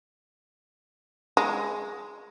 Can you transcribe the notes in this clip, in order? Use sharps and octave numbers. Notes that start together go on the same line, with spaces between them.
G#3